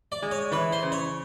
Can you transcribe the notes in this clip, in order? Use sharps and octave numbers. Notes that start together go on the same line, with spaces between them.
D5
G#3
C#5
E3 B4
C5
C#3
C#5